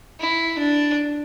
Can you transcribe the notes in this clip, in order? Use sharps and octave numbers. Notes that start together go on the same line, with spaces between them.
E4
D4